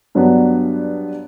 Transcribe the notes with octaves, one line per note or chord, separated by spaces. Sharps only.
G2 F#3 B3 D4